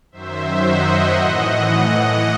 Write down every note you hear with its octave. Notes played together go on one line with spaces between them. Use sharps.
F#2 D#3 F#3 C5 E5
D#5 F#5
A2 D#5 F#5
E3